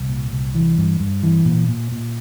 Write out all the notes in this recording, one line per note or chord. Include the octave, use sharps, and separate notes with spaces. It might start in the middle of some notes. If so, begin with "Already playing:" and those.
Already playing: C2
A#2
C2
E3
G2
G2
E3
A#2
A#2
A#2